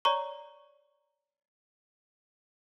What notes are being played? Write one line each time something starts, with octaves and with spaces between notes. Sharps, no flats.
C#5 D5 A#5 C#6